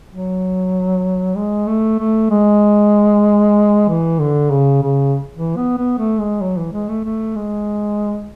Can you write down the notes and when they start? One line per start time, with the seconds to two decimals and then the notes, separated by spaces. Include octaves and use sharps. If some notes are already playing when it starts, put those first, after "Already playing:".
0.09 F#3
1.35 G#3
1.67 A3
1.99 A3
2.30 G#3
3.89 E3
4.19 D3
4.51 C#3
4.83 C#3
5.36 E3
5.56 B3
5.78 B3
5.99 A3
6.20 G#3
6.41 F#3
6.57 E3
6.73 G#3
6.88 A3
7.04 A3
7.35 G#3